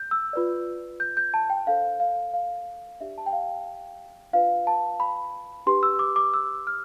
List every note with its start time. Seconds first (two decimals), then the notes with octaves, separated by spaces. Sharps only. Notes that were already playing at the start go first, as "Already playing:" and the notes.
Already playing: G6
0.11 E6
0.33 F4 B4 D5
1.00 G6
1.17 G6
1.34 A5
1.50 G5
1.67 D4 A4 C5 F5
2.00 F5
2.34 F5
3.01 D4 G4 D5 E5
3.18 A5
3.26 G5
3.33 F5
4.33 D4 F4 B4 D5 F5
4.67 A5
5.00 B5
5.66 D4 G4 B4 C6
5.83 E6
5.99 D6
6.16 D6
6.34 E6
6.67 F6